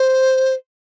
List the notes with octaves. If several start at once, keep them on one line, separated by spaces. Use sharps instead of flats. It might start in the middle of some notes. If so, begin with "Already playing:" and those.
Already playing: C5